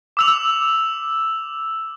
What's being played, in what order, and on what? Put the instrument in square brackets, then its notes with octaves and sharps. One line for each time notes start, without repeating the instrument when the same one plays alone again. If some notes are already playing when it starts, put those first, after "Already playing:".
[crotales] D6 E6 F7